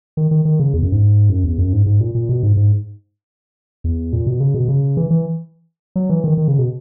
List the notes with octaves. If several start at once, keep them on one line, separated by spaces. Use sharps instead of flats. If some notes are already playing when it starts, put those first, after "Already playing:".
D#3
D#3
D#3
C#3
E2
F#2
G#2
F#2
E2
F#2
G#2
G#2
A#2
A#2
B2
G#2
G#2
E2
A#2
B2
C#3
B2
C#3
E3
E3
F#3
E3
D#3
D#3
C#3
B2